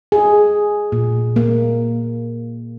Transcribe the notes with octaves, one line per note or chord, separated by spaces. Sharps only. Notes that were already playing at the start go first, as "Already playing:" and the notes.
G#4
A#2
A#3